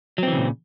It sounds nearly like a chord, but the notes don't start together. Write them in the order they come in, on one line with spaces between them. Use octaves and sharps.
F#3 C4 E3 C#3 A#2